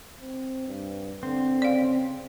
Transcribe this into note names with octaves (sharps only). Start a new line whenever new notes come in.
C4
G2
D3 C4
C#3 D5 F5